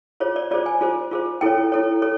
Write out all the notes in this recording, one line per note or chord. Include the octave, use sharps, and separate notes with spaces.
F4 G#4 C5 C#5
D5
F4 G#4 C5 D5
G#5
F4 G#4 C5
F4 G#4 C5
E4 A4 C#5 G5
E4 A4 C#5
A4 C#5